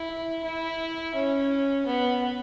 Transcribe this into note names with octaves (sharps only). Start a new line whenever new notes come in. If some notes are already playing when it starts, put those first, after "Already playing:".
Already playing: E4
E4
C#4
B3